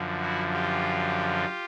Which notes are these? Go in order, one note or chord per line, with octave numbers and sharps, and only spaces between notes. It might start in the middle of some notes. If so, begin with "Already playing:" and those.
Already playing: F#2 D3 F3
E4 F#4
F4 G4